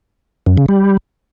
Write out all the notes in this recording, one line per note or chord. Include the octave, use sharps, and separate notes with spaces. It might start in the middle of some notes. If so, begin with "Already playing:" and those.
F#2
C#3
G3